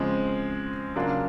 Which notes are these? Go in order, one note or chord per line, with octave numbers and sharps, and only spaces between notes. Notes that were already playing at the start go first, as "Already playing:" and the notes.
Already playing: C#3 F3 G#3 C4
C#3 F#3 A#3 D4 F4